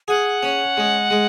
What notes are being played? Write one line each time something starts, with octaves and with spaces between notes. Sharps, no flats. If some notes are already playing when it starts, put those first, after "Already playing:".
G#4 F#5
C#4
G#3
G#3